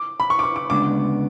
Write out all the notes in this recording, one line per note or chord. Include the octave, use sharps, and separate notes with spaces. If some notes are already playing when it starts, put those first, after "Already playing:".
Already playing: D6
B5
C#6
D6
C#6
D6
D2 C#3 G#3 B3 D4 D6